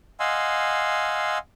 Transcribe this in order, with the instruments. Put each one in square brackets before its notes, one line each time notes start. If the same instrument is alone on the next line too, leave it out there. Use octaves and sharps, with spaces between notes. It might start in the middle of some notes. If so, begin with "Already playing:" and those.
[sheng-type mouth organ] D#5 F5 F#5 G#5 C6 E6